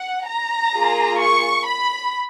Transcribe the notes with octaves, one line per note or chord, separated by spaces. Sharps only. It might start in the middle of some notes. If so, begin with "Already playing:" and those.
Already playing: F#5
A#5
A#3 F4 G#4
C#6
B5